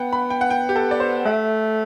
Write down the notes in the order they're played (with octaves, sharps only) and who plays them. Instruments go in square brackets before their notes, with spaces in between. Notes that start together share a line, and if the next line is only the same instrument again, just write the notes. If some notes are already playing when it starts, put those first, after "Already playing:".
Already playing: [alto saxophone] B3 [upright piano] F#5 G5
[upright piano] B5
G5
F#5
G5
G4
A4
D5
C5
[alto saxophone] A3 [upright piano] E5